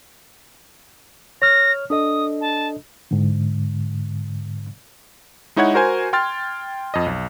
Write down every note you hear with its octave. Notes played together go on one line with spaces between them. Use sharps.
C#5 F6 A#6
D4 A4 D#5 D#6
A5
G#2 D3
G#3 D#4 E4 C#5 F#5 G#6
F#4 A#4 C5 G#5
G5 C6 F6 A6
F2 D#5
B1